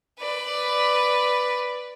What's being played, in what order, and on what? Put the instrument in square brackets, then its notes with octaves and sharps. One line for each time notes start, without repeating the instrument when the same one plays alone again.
[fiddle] B4 D5